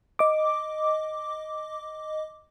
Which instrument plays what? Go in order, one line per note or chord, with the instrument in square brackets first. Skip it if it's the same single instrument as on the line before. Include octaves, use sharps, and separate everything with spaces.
[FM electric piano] D#5 D6